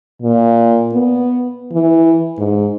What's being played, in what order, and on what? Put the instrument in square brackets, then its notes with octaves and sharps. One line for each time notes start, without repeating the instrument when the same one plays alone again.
[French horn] A#2
B3
E3
G#2